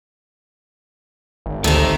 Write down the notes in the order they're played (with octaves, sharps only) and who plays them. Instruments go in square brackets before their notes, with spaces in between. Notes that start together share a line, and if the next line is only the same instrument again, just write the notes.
[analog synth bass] G#1
[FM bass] D2 [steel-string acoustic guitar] C3 A3 [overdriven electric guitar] D#3